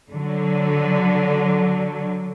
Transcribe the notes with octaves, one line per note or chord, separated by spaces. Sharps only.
D3 F#3